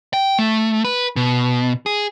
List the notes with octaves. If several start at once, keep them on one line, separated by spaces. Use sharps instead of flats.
G5
A3
B4
B2
G#4